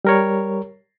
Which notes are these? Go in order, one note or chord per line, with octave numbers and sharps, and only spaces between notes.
G3 A#4 C#5